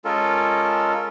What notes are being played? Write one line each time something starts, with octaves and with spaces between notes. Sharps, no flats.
G#3 C#4 F4 A4 A#4